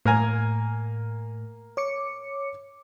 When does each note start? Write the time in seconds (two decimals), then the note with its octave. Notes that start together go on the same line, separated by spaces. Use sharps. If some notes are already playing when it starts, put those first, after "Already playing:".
0.05 A2 A#3 A#4 G#5
1.77 C#5 D6 C#7